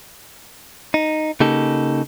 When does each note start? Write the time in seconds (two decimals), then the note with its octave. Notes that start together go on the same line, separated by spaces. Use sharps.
0.94 D#4
1.40 C#3 A#3 D#4 G4 A4